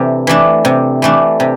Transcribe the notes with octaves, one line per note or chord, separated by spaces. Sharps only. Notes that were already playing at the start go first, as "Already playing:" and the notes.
Already playing: C3 E3 A3 D4
E3 A3 D4
C3
E3 A3 D4
C3